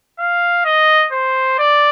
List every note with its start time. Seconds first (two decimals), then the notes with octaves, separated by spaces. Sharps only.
0.19 F5
0.65 D#5
1.12 C5
1.59 D5